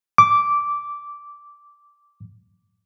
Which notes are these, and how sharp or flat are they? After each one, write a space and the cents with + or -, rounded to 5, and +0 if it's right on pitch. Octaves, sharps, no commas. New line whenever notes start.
D6 -10